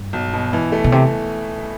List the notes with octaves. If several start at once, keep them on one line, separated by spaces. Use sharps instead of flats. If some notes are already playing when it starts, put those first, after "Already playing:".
Already playing: G2
B1
B2
E3
A3
B2
C3